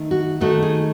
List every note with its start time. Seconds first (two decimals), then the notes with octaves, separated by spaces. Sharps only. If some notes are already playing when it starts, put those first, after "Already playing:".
Already playing: D#3 A3 D#4
0.11 F#4
0.41 D#3 A3 D#4 F#4
0.63 G#4